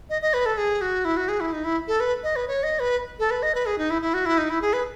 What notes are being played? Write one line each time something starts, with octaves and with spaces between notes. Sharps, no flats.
D#5
D#5
B4
A4
G#4
F#4
E4
F#4
G#4
E4
D#4
E4
A4
B4
D#5
B4
C#5
D#5
B4
A4
B4
D#5
B4
G#4
D#4
E4
E4
F#4
E4
D#4
E4
G#4
B4